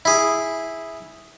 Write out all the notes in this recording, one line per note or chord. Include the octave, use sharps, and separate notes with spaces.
E4 G#4